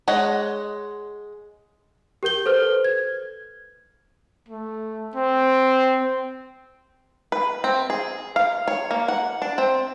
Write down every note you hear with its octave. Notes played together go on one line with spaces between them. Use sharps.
G#3 C#5 D#5 F#5
G4 A#4 G6 G7
A4 B4 C5 F6
G#6
A3
C4
B4
C4
G#4
F5
C#5
A#3
F#5
D4
C4